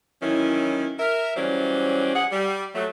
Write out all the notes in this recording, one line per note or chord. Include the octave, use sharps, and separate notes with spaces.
D#3 E3 F#3 C#4 E4
A#4 E5
E3 F#3 G3 C#4 C5 D5
G#4 F#5
G3
F#3 A3